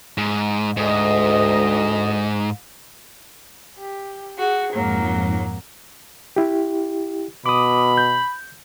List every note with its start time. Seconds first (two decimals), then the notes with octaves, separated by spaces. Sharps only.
0.18 G#2
0.77 D2 G#2 D#5
3.76 G4
4.37 F#4 G#4
4.73 F2 G#2 F#3 A#3
6.36 E4 G4
7.46 B2 B5 D6 D#6
7.98 G6